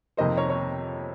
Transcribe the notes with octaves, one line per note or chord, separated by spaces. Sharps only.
F2 C3 D#3 A#3 C5 D#5
A#4 C#5
C#5